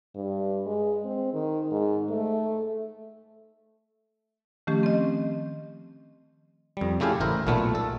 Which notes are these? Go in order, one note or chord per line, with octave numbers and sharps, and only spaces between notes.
G2
G#3
C4
D#3
G#2
A3
D#3 F3 A3 C#4 G4
C4 D#5
F2 G3
C#3 A3 E4 G4 F5 G#5
A1 E4 A#4 C5
B1 A#2 A3 B4 F#5
A4